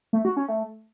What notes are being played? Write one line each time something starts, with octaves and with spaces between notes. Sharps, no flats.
A3
F#4
C#4
A3